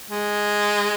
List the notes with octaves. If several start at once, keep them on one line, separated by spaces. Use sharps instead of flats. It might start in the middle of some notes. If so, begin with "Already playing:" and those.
G#3